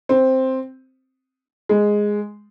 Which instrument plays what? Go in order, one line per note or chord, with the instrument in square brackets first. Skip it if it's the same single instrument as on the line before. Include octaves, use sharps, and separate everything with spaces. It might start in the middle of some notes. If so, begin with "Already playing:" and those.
[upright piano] C4
G#3